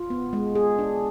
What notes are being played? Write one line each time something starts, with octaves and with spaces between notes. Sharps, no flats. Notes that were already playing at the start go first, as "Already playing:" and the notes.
Already playing: F4
B3
G#3
G#4
D4